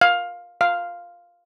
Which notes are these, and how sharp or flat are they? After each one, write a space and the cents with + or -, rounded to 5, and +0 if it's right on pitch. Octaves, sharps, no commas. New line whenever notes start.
F5 +15
F5 +0